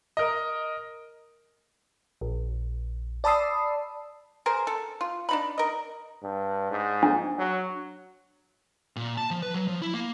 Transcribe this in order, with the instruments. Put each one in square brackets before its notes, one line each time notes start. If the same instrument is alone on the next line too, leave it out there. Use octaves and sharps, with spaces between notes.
[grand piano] A#4 D#5
[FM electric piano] A#1
D5 A5 B5 D#6 E6 C7
[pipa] G#4 A#4 C5
A4
F4
D4 D#4 B5
A#4 D#5
[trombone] G2
G#2
[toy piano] D4
[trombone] F#3
[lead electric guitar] A#2
A5
F3
B4
F#3
F3
E4
A#3